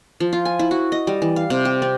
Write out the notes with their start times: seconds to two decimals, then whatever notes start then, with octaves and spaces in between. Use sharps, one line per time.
0.20 F3
0.33 F4
0.45 G#5
0.59 E4
0.71 F#4
0.92 D#5
1.07 G3
1.22 E3
1.36 F5
1.50 C3
1.65 G4
1.82 C4